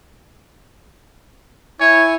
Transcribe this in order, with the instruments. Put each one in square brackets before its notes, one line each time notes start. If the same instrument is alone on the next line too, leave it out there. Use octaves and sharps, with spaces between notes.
[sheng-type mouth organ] E4 G#5 [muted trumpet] C#5